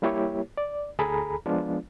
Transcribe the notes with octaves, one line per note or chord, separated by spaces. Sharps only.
G3 A#3 E4 G4 C#5
D5
D2 G#4 A4 A#5 B5
F3 G#3 B3 D4 F4